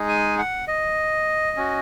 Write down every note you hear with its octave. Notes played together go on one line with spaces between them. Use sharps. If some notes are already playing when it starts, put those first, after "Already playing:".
Already playing: G#3 D#4 G#4
G#5
F#5
D#5
C#4 F#4